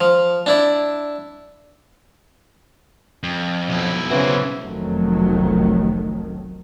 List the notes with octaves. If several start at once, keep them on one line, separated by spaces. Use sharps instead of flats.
F3
D4 E4 D5
F2
B1 E4
C#3 E3 F#4 C5
F1 B1 F2 D#3 F#3 A3